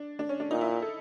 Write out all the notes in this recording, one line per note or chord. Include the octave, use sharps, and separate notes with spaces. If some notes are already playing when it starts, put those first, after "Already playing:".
Already playing: D4
D4
C#4
D4
A#2 D#4
E4
A4